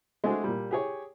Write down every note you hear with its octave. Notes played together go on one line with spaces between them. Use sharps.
G#3 A3 C4 D4 F#4 G#4
A#2 G3
G4 G#4 C#5